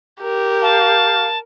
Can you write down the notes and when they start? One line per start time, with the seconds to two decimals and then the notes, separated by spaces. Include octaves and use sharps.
0.22 G4 A#4
0.62 F5 A5